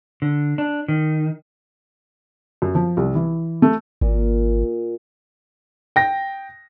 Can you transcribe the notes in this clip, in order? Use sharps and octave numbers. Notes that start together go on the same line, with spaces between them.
D3
D4
D#3
F#2
F3
C2
E3
A3
G#1 A#2
G5 A#6